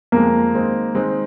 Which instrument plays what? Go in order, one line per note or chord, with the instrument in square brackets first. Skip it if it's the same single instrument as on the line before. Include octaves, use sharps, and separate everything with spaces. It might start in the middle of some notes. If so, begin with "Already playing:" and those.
[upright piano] F2 F3 G#3 [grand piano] A#3
[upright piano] D#3 G#3 C4 D#4
D#3 G#3 C4 D#4